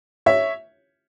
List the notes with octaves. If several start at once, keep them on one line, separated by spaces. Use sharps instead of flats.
C#5 E5